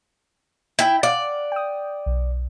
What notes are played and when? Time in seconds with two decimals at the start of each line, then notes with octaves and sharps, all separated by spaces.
0.79 E4 G5
1.03 D5 F5 F#5
1.52 G5 D#6
2.06 B1